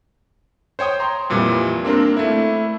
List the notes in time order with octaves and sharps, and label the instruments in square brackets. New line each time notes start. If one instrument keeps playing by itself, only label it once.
[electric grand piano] C5 C#5 G5 D#6
A#5 C6
F2 A#2 E3 G3
A#3 C4 D4 A#4
A3 E4